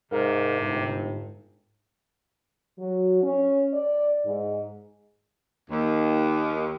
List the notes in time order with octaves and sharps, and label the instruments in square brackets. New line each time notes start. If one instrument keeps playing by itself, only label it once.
[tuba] G#2 [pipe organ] C3 [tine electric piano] A#4 F5 A#5
[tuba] G1 [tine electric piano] G#2
[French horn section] F#3
C#4
D5
G#2
[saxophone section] D#2